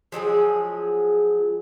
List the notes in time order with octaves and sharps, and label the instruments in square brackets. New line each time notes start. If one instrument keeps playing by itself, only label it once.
[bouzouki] F3 F#3 G#3 G#4